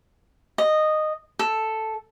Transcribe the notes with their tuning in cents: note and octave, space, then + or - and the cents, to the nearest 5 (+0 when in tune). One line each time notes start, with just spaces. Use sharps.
D#5 -10
A4 +0